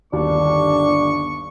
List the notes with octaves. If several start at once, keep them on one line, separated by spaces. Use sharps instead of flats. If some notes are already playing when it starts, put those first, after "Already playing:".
G1 D#2 D4 C#6